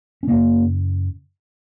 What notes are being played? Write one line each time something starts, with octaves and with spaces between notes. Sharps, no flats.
C#4
F#2 C#3 A#3